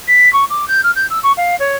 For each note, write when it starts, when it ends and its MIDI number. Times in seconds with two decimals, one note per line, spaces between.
0.07 0.31 95
0.33 0.44 85
0.50 0.67 86
0.68 0.81 91
0.83 0.91 89
0.95 1.06 91
1.10 1.19 88
1.23 1.32 85
1.37 1.57 77
1.59 1.76 73